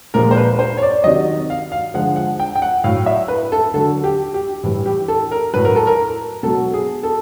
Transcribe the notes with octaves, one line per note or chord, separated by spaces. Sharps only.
A#2 F3 G#3 A#4
C5
B4
C5
C#5
D5
C3 D#3 F#3 D#5
F5
F5
D3 F3 G#3 F#5
F#5
G5
G5
F#5
A2 F#3 F5
E5
B4
A4
D3 F#3 A4
G4
G4
A2 E3 G3
G4
A4
A#4
A2 F#3 B4
A#4
A4
A#4
B2 F#3 A4
G#4
A4